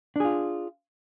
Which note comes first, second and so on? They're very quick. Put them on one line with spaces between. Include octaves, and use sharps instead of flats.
D4 G#4 F4